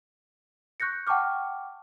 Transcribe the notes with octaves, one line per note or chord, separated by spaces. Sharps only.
C#6 F#6 G6 A#6 C#7
F#5 G5 A5 C#6 D6 F6